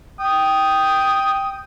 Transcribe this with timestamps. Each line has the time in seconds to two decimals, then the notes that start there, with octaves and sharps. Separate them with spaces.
0.20 G5 D#6